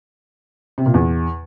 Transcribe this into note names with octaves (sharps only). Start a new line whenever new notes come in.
C3
A#2
E2